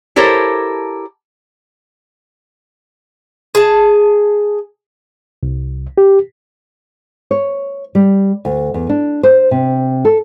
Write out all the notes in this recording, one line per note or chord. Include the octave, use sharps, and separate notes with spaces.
E4 G4 A4 A#4 C5 C#5
G#4 A5
C2
G4
C#5
G3
D2
E2
D4
C5
C3
A4